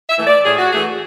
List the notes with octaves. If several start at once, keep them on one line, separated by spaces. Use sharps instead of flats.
E5
E3 A3
D5
A2 G#4
F#4
E3 A3 G#4